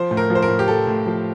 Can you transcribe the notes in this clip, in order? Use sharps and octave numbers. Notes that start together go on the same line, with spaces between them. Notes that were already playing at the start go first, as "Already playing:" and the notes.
Already playing: F3 C5
A2
A#4
F3
C5
A#4
A2
G4
F3 A4
A2
F3